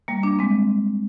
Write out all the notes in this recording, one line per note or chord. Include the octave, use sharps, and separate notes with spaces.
G3 A#3
A#3 D4
G#3 C4